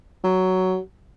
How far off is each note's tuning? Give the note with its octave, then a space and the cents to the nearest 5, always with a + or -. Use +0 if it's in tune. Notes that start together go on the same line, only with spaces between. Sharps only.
F#3 +10